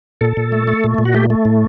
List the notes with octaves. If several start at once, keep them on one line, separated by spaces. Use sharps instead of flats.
A#2 A4
A#2
A3
A3
A#2
A#2
F#4
A3 G4
A3
A2